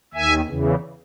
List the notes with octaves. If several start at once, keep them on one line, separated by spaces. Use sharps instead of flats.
D#2 D#3 E5 G#5
E2 C#3 E3